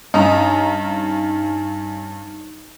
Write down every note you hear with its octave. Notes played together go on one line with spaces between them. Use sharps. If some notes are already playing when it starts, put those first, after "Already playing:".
G2 C#4 D#4 A#5